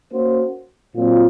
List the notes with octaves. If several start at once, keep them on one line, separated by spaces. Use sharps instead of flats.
A#3 C#4 F#4 C5
A#2 F#3 C4 F4